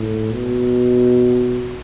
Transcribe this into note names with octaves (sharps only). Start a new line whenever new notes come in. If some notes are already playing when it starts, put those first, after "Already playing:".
Already playing: A2
B2